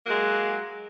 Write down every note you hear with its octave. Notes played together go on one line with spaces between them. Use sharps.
F#3 G#3 A#3